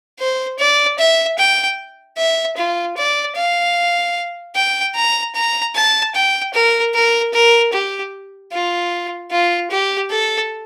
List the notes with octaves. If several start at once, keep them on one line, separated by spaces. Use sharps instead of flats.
C5
D5
E5
G5
E5
F4
D5
F5
G5
A#5
A#5
A5
G5
A#4
A#4
A#4
G4
F4
F4
G4
A4